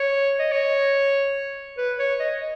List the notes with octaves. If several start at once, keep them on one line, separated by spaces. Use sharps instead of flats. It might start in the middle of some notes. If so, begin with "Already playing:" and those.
Already playing: C#5
D#5
C#5
B4
C#5
D#5